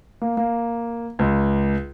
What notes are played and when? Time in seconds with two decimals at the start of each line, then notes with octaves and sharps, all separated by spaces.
0.22 A#3
0.37 A#3
1.19 C#2